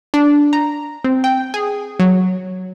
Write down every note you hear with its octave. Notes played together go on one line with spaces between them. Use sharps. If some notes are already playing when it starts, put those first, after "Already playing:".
D4
A#5
C4
G5
G#4
F#3